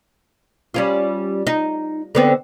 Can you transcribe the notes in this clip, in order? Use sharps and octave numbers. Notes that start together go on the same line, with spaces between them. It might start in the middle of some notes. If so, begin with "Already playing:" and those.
G3 C#4 F4
D#4
D3 B3 C4